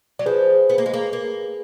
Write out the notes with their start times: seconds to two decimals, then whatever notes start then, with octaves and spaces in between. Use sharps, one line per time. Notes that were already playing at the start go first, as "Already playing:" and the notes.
0.19 F#3 D5
0.26 F3 G#4 B4
0.70 B3
0.78 A#3
0.86 G#3
0.94 A#3
1.13 A#3